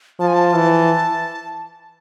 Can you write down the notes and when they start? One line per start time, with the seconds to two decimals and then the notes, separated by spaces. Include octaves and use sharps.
0.19 F3 A5
0.28 G#5
0.34 A5
0.55 E3